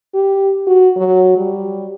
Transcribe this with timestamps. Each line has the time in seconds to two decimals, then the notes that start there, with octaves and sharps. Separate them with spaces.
0.14 G4
0.67 F#4
0.97 F#3
1.37 G3